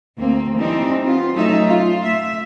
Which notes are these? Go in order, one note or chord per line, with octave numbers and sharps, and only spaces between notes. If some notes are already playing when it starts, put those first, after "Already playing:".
D2 A#3 C4
E3 G3 C4 D4 D#4
B3 F4
F#3 A3 C#4 D#4 A4 E5
F4
A3 E5